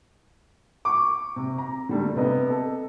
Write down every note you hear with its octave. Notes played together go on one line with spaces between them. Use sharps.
C#6 D6
C3
A#5
D3 G3 A3
C3 B3 D#5
A4